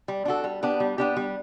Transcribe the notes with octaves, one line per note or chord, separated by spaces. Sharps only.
G3
D4 F#4 A4
G3
B3 D4 G4
G3
B3 D4 G4
G3